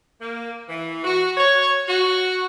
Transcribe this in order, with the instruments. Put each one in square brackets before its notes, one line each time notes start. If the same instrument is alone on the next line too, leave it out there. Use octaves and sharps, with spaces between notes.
[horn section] A#3
E3
F#4
C#5
F#4